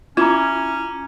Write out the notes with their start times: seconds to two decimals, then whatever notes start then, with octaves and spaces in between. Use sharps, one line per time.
0.17 C#4 E4 F4 A#5 D6 G#6